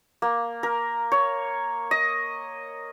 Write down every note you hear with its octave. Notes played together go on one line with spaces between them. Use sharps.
A#3
A#4
C#5
D#5